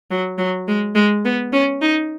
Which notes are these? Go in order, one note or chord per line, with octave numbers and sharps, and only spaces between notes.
F#3
F#3
G#3
G#3
B3
C#4
D#4